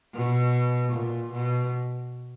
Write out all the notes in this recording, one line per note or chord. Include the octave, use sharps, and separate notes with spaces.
B2
A#2
B2